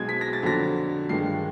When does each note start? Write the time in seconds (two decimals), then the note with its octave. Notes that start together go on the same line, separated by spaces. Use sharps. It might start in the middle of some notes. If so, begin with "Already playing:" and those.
Already playing: B1 B2 G#3 G#6
0.09 B6
0.21 A#6
0.33 A6
0.43 F2 D3 F#3 A#6
1.09 G2 D#3 G#3 C7